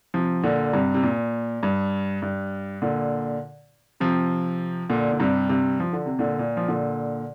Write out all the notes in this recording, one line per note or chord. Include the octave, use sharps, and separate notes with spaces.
C3 F3
A#2 D3
G2 C3
C3
A#2
G2
G2
A#2 D3
C3 F3
A#2 D3
A#2
G2 C3
G2 C3
F3
D3
C3
A#2 D3
A#2
F3
A#2 D3